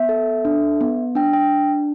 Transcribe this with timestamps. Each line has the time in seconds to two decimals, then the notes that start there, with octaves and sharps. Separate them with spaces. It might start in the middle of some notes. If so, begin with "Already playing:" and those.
Already playing: B3 E5
0.09 A4
0.45 D4
0.81 B3
1.15 D4 G5
1.33 G5